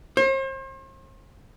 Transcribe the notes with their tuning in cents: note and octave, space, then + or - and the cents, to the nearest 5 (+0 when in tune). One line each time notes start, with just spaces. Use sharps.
C5 +40